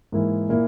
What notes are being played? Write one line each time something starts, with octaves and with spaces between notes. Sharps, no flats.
G#2 E3 A#3 E4
A#2 A#3 E4